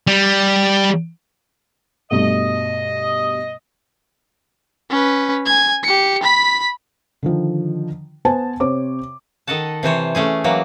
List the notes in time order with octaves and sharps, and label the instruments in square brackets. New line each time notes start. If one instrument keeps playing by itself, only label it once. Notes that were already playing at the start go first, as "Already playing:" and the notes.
[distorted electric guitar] G3
[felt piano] G2 B2 A3 [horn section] D#5
[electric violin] C#4 B4
G#5 G#6
G4 C#7
B5 B6
[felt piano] D3 D#3 F3
B3 B4 C5 G#5 A5
C3 C5 C#5 D6
[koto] D#3 A4 D#5 F#5 A5
C3 E3 C5 C#5
A3 C#4 G#4
E3 F#3 A#3